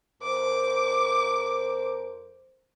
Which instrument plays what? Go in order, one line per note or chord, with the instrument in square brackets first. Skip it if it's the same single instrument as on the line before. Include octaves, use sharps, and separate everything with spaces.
[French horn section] F2 A#4 C5 [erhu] D6